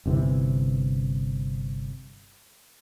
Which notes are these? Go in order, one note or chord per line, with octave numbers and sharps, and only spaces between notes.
G1 C3 E3